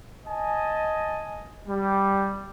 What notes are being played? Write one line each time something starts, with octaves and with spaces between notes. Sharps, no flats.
D#5 G#5 A5
G3